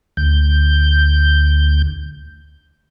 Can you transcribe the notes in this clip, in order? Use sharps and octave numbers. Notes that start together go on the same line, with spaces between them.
D2 G6